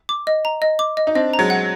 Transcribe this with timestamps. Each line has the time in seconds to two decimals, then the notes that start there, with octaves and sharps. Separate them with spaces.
0.09 D6
0.27 D#5
0.45 A#5
0.62 D#5
0.79 D6
0.97 D#5
1.07 D#4
1.15 C4 D4 D#5
1.33 A#5
1.39 F#3 G#3
1.50 F#5